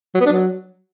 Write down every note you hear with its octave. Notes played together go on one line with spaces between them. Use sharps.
F#3
B3
D4
F#3